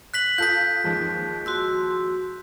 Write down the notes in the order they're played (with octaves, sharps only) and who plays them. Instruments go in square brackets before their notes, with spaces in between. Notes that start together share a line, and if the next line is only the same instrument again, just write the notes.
[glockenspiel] F#6 B6 F#7
[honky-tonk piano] F4 A4 D#6 [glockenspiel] G6 B6
[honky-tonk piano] D#2 F3 G#3
[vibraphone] F#4 C6 E6